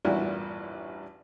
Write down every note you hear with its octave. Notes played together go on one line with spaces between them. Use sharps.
A1 E2 G2 A#2 E4 F#4